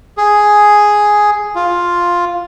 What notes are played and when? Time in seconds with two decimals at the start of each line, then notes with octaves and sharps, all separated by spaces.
0.18 G#4
1.55 F4